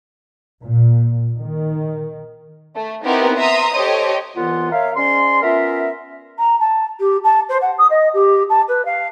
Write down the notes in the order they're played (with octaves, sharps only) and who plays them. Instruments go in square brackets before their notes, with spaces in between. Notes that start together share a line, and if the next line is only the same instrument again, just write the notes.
[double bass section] A#2
D#3
[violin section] A3
B3 C4 D#4 E4 G4 A#4
E5 A#5 C6 D#6
G4 A4 C5 C#5 D#5
[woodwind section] C2 E3 B3 F4 F#5 C6
A#4 C#5 E5 F5
G#2 C#4 D5 C6
B3 C#4 F4 A#4 E5
[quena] A#5
A5
G4
A5
C5
F#5
D#6
D#5
G4
A5
B4
F5